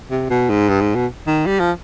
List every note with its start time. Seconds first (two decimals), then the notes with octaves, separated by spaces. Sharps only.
0.11 C3
0.30 B2
0.49 G#2
0.69 G2
0.81 G#2
0.95 B2
1.27 D#3
1.46 G3
1.60 F3